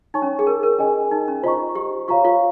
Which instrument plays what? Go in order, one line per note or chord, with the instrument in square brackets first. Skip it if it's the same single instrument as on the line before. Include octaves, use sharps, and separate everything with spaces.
[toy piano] D#4 [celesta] C#5 G#5 C#6
[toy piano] C#4
G#4
A#4
A#4
[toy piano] C#4 [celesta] G#4 D#5 G#5
[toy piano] D#4
C#4
[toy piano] F4 [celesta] C5 D#5 A#5 C#6
[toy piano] G4
[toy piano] F4 [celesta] C#5 F5 A#5 C#6
[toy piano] F4